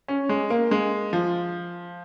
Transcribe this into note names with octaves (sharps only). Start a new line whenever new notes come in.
C#4
G#3
A#3
G#3
F3